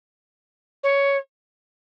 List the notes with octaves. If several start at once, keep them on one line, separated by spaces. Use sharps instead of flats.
C#5